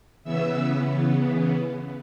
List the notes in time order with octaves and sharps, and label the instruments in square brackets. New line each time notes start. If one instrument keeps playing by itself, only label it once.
[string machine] C#3 E3 B3 E5 E6